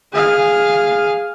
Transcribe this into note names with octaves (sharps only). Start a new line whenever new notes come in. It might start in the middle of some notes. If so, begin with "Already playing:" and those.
G#4 F5